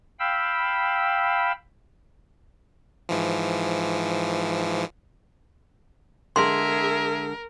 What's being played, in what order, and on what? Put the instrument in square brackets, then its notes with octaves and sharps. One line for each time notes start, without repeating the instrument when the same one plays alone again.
[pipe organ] F5 G5 B5 E6
[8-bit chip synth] G#2 E3 F3
[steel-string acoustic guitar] D3 G#3 [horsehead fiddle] G#4 E5 [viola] A#4 [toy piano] C6